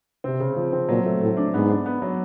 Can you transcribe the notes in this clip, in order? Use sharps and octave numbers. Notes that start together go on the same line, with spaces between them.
C3 C4
C#3
F3
C4
A#2 F#3
A3
A2 A3
D4
G#2 B3
D4
B3
F#3